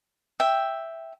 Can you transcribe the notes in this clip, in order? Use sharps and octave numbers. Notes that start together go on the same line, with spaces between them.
E5 G5